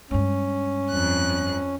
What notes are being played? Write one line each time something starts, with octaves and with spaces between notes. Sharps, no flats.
G2 G#3 C#4
F2 F#6